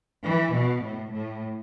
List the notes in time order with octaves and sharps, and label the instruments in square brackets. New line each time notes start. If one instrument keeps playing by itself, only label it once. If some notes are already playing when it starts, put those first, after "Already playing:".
[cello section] E3
B2
A2
A2